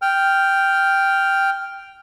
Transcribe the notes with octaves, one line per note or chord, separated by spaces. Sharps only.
G5 F6